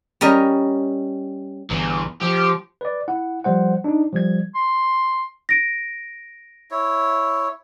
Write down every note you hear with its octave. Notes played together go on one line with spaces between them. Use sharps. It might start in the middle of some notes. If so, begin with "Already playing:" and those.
G3 C#4 A#4 D#5
G1 E2 E3
F3 G4
B4 D5
E4 F#5
F3 G3 C5 F#5
D4 D#4
F3 G3 G#6
C6
A#6 D7
E4 C#5